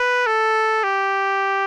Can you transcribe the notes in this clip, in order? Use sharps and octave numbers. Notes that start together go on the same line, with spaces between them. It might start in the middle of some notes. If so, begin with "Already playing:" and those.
Already playing: B4
A4
G4